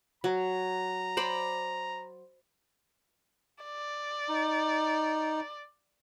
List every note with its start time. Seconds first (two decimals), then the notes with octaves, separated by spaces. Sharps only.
0.24 F#3 A#5
1.17 C5 D5 B5
3.64 D5
4.29 D#4